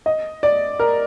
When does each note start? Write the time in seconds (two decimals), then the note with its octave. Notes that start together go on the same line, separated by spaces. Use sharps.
0.06 D#5
0.43 D5
0.80 A#4